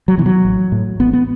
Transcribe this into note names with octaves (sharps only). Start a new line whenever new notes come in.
F#3
B2 E3
F#3
A1
A2
A1 B3
B3